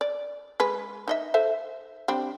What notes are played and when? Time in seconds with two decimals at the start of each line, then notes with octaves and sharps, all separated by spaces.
0.01 D5
0.60 G#3 B4
1.08 D#4 D#5 E5
1.34 A4 C5 E5
2.08 G3 C4 D4